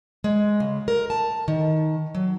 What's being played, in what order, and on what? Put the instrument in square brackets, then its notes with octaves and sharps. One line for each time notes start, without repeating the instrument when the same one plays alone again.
[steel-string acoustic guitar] G#3
C#3
A#4
A5
D#3
F#3